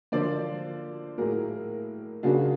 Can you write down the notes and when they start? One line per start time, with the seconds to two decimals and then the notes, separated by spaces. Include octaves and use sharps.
0.12 D3 F3 A#3 C5 D5
1.18 A2 F#3 A#3 G#4 A#4
2.23 C#3 F#3 A#3 D4 F4 F#4 G#4